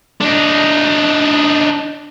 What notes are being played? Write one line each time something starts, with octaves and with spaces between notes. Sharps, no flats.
D4 D#4